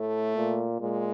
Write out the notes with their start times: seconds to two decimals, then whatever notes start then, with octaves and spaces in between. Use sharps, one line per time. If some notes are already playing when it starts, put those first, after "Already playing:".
Already playing: A2 A3
0.36 A#2
0.80 A#2 G#3